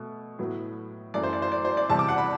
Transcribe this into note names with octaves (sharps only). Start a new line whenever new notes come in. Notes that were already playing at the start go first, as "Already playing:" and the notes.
Already playing: B2 A3
A2 F#3 B3
F#2 E3 A3 D5
C5
D5
C5
D5
C5
D5
E2 C3 G3 A5
D6
F#5
B5